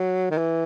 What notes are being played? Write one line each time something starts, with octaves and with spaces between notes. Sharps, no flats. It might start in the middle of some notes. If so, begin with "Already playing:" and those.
Already playing: F#3
D#3
E3